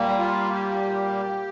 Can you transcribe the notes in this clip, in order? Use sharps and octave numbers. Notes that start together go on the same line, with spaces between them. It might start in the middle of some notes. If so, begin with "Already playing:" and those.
Already playing: A#2 G3 A#3
F4
G4